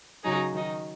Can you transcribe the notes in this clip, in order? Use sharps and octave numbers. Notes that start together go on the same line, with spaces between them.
C#3 F#3 D#4 G#4
D#3 F#3 D#4